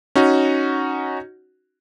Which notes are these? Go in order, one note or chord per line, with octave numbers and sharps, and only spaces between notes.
C#4 D#4 F#4